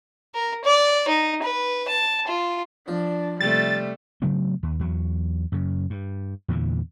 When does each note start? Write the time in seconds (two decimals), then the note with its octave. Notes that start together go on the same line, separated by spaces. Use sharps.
0.35 A#4
0.64 D5
1.08 D#4
1.42 B4
1.88 A5
2.27 F4
2.88 F3 D4
3.41 C3 G3 A3 A6
4.22 C#3 F#3 A3 C4
4.63 D#2
4.79 E2 F#3
5.52 F#2 C#3
5.90 G2
6.48 E2 A#2 D3 E3